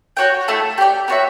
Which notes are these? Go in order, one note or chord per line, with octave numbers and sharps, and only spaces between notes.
F#4 C#5 G5
A3 E4 A4
G4 D5 G5
B3 F#4 C#5 E5